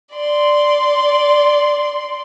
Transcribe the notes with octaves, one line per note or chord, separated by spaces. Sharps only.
D5 C6